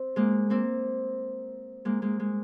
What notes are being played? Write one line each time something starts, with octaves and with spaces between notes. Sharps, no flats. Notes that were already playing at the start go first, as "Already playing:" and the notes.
Already playing: C4
G#3 A#3
A#3 C4
G#3 A#3
G#3 A#3
G#3